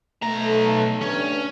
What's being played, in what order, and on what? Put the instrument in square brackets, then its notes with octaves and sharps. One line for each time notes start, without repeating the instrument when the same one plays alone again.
[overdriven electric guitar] B1 A#5 [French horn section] A3
[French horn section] G2 [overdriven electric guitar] C#4